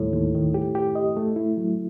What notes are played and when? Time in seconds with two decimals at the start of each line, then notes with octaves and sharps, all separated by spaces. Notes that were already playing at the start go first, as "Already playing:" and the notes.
Already playing: D#2 A2 G3
0.13 D#2
0.35 D#3
0.54 G4
0.75 G4
0.95 D#5
1.17 A3
1.36 E4
1.57 F#3